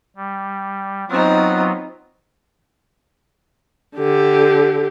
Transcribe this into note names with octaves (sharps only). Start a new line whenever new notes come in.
G3
F#3 B3 C4 D#4 F4
D3 G4